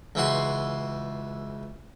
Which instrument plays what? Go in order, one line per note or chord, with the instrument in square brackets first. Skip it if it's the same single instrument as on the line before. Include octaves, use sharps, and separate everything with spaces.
[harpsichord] C#2 E3 F#4 C6